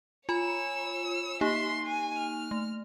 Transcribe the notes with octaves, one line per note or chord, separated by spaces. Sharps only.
F4 C#5 G#5 B5 E6
A#3 D#4 G4 E5 C6
G#5
F6
A3